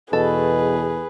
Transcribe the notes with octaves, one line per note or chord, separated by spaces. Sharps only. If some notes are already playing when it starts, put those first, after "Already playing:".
E2 B2 G#4 A4 B4